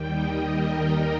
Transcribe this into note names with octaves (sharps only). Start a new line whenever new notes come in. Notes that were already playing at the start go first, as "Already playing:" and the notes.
Already playing: D#2 D#3 G3 G5
D#5
A#4